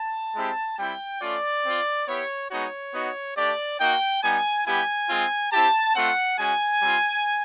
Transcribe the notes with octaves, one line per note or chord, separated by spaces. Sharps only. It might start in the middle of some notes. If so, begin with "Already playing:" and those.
Already playing: A5
G#3 C4 E4 G4
G3 C4 E4 G5
A3 C#4 F4 D5
C4 F4
B3 E4 G4 C#5
G#3 B3 D#4 F#4 C#5
B3 D#4 F#4
A3 D4 G4 D5
A#3 D#4 F#4 G5
G3 B3 D#4 G#5
G3 B3 E4 G4 G#5
G#3 C4 F4
C4 E4 G4 A5
A3 C4 F4 F#5
G#3 C#4 F#4 G#5
G3 C4 F4